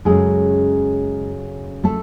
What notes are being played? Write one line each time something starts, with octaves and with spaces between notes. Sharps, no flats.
F#2 C#3 F#3 G#3 A3 G#4
A3 A4